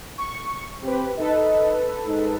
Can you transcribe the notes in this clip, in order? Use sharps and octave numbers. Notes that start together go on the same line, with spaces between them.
C#6
C4 G4 B4
D#4 A4 B4 D#5
G#2 D#4